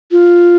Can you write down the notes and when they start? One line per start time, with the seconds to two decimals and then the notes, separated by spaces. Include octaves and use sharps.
0.12 F4